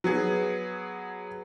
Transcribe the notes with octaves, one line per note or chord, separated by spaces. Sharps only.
F#3 B3 G#4